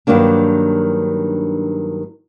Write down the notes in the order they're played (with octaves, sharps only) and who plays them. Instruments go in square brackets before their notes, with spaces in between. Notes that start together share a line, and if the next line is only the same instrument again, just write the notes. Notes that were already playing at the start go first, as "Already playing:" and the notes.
[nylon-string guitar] G2 D#3 F#3 A#3 D4